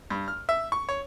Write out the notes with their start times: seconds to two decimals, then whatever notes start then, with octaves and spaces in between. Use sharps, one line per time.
0.10 G2
0.28 F6
0.49 E5
0.72 C#6
0.89 C#5